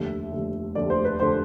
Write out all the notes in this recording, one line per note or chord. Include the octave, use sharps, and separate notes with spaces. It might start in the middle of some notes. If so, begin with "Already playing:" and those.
Already playing: F1 D#2 D3 E5
F1 D#2 D3
F1 D#2 D3 D5
C5
B4
F1 D3 C5